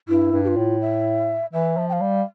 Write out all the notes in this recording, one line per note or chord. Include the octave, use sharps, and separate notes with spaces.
G2 E4
G2
G4
F4
A2
E5
E3 E5
F3
G5
F5
G3